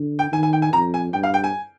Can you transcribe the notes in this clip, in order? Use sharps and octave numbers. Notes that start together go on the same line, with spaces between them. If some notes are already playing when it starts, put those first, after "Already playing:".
Already playing: D3
G5
D#3 G#5
G#5
G5
G#5
F2 A#5
G#5
G2 G5
F5
G5
G#5